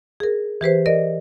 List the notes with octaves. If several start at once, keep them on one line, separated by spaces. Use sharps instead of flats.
G#4 A#4
E3 G4 B4 C5
A#4 D5 D#5